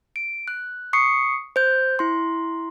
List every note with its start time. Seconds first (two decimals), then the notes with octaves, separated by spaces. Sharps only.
0.16 D7
0.48 F#6
0.93 C#6 D#6 C7 C#7
1.56 C5 G6
1.99 E4 C6